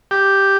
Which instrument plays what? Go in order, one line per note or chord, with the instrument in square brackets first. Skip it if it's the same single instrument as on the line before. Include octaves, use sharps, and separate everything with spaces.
[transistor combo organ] G4